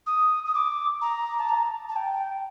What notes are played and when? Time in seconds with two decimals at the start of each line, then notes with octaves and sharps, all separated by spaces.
0.07 D#6
0.46 D#6
0.55 D6
1.01 A#5
1.39 A5
1.49 A#5
1.89 A5
1.96 G5